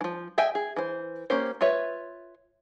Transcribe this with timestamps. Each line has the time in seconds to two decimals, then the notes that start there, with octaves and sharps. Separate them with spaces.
0.01 E3 F3
0.38 D#5 E5 G5 G#5
0.55 G#4
0.76 E3 C5
1.30 A#3 C#4 G4 C5
1.61 F4 B4 C#5 E5